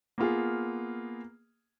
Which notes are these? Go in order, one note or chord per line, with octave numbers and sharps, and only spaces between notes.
A#3 B3 F4 G#4